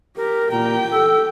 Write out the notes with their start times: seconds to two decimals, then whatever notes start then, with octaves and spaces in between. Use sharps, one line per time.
0.17 G4 A#4
0.51 A#2 G4 G5 A#5
0.92 A4 E6